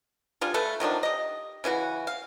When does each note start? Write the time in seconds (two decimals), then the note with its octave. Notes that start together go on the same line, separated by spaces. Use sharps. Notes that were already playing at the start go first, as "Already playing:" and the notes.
0.41 G3 D4 F4 G#4
0.54 A3 A4 B4
0.80 D#3 F3 F#3 D4
1.03 G4 D#5
1.64 C#3 E3 F4 F#4
2.07 F5